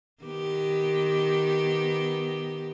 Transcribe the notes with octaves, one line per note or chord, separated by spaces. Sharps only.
D#3 B3 G4